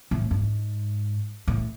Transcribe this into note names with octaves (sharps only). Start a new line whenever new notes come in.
A2
G#2
A2